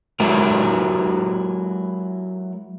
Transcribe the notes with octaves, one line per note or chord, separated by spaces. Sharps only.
F#3 G#3 E4 F#4 A#4